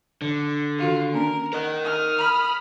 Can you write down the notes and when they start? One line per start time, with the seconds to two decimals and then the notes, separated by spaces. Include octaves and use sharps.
0.22 D3
0.79 D#3 F4 F#4 A4
1.13 A#3 C#4 D4 A#4
1.53 A#4 D#5 F#5
1.85 D#6 F6
2.18 B5